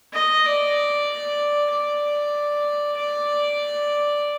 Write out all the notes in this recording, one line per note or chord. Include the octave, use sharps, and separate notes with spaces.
D#5
D5
D5
D5